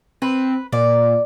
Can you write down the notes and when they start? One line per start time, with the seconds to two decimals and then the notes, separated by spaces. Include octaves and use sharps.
0.22 C4 B4
0.72 A#2 D5